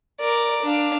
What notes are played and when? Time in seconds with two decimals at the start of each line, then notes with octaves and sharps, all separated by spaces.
0.20 A#4 D5
0.63 D4 F5